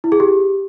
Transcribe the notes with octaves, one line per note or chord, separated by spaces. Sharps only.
E4
G#4
G4